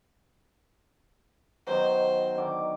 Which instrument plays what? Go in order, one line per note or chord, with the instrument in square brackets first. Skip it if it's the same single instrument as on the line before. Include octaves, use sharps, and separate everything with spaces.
[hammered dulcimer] B2 D#3 F#3 [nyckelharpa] C5
[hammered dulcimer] D3 D#3 D6